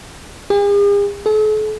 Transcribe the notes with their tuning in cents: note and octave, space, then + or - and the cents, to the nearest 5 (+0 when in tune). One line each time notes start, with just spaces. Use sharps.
G#4 -45
A4 -45